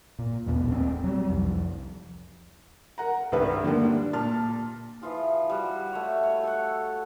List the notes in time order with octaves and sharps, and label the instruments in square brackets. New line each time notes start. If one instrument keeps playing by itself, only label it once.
[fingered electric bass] A#2
A1 E2 B2
D#1 A#3 C4
F#3 G3
C2 F2
[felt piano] A#4 F#5 A#5
C2 G2 D#3 B4 E5
D#2 D3 G3 A#3
D4
A#2 A5 F6
[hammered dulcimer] E3 F3 F4 G#4
G3 F#4
A3 C#5
C#5
A4 F#5